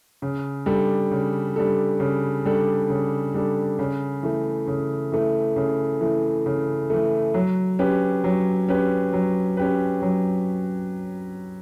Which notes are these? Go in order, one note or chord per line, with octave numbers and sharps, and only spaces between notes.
C#3
G3 D4 A4
C#3
G3 D4 A4
C#3
G3 D4 A4
C#3
G3 D4 A4
C#3
E3 A3
C#3
E3 A3
C#3
E3 A3
C#3
E3 A3
F#3
C#4 G4 B4
F#3
C#4 G4 B4
F#3
C#4 G4 B4
F#3